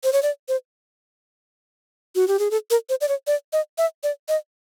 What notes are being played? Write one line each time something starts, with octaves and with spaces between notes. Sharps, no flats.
C5
C#5
D5
C5
F#4
G4
G#4
A4
A#4
C5
D5
C#5
D5
D#5
E5
D5
D#5